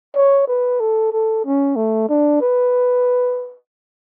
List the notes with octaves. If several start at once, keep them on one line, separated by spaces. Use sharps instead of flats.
C#5
B4
A4
A4
C#4
A3
D4
B4